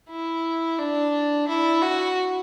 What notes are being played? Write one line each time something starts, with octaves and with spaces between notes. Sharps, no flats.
E4
D4
E4
F#4